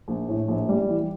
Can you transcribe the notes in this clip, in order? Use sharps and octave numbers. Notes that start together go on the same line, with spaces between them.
A#1
A2
A#1
G3
E3